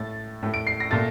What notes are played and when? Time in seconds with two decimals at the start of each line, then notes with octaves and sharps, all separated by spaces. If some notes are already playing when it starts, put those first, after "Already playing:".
Already playing: A2 A3 A6
0.43 A2 A3
0.54 D7
0.67 C7
0.80 A#6
0.90 A#2 A3 A6